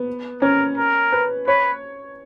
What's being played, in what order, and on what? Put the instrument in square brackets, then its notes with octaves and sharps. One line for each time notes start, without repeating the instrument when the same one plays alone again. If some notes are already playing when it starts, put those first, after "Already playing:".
Already playing: [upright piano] B3
[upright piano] C#4 [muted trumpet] A#4
[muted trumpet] A#4
[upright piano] B4
[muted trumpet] B4 [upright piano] C#5